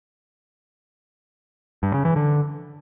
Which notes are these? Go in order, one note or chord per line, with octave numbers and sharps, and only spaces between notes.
G2
C#3
E3
D3